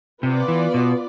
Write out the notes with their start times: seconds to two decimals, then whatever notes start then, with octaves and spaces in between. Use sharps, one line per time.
0.23 C3 B3 F4 B4 D5
0.48 E3
0.74 B2